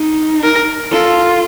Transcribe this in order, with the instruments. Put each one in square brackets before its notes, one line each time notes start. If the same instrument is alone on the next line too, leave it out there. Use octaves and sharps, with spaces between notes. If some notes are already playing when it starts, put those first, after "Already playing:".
Already playing: [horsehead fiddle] D#4
[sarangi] A#4
[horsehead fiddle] F4 [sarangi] A4